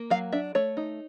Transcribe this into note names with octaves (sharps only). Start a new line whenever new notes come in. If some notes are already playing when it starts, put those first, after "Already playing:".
Already playing: A#3
F#3 F5
D4 E5
A3 C#5
D#4